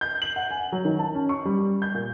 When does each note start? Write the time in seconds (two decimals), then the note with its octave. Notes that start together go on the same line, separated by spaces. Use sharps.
0.01 G6
0.22 F#7
0.36 F#5
0.51 G#5
0.72 F#3
0.85 D#3
0.99 A5
1.14 C#4
1.29 C#6
1.45 G3
1.82 G6
1.95 A#2